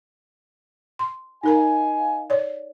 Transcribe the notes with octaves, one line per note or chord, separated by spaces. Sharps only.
C6
D#4 A#4 D#5 F5 G#5 A#5
C#5 D5